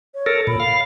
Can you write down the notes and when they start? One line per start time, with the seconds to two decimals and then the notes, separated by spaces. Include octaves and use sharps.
0.15 C#5
0.26 A4 A#4
0.47 A#2 B5
0.60 F5